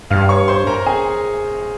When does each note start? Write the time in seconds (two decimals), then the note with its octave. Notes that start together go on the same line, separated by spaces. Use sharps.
0.10 G2 F5 F6
0.29 C#5 C#6
0.48 C5 C6
0.67 A#4 A#5
0.86 G#4 G#5